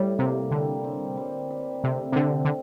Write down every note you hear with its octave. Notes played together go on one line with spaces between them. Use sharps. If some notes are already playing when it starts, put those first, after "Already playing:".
Already playing: A2 G3
C3 A#3
D3 G3
C4
G3
G3
C3 A3
C3
D3 C4
D3